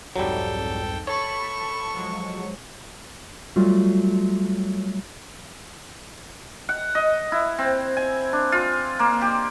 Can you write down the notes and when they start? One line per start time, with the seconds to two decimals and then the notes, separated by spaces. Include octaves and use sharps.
0.16 C2 F2 G#2 F#3 G3 A4 G5
1.07 A4 C#5 A5 B5 C#6
1.93 F3 F#3 G#3
3.56 F#3 G3 A3 F4
6.69 F#5
6.95 D#5
7.32 E4
7.58 C4
7.97 G#5
8.33 D4
8.52 F4
8.99 A#3
9.21 G4